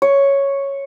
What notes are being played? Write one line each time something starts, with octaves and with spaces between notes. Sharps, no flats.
C#5